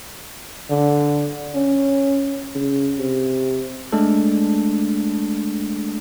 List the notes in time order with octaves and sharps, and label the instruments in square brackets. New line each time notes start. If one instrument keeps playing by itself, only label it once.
[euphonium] D3
C#4
[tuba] C#3
C3
[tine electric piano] G#3 A3 D4 A4